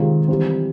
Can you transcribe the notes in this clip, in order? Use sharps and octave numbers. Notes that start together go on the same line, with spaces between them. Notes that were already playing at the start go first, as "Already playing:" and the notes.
Already playing: C3 D#3 G#3 C4 F4
E3 G3 C4